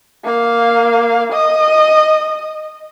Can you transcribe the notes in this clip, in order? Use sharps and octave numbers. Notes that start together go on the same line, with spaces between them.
A#3 F5
D#5 D#6